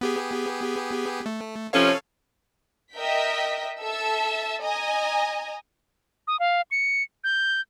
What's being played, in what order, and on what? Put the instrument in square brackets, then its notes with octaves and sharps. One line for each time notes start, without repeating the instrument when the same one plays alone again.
[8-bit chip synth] B3 G4 G#4
A3
[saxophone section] C3 F3 C#4 [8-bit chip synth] A4 C#5 F5
[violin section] A#4 D#5 E5 G5 B6
A4 E5 A5 E6
D#5 G#5 A#5
[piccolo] D#6
F5
C#7
G6